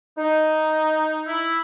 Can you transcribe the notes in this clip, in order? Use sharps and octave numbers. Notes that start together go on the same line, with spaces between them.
D#4
E4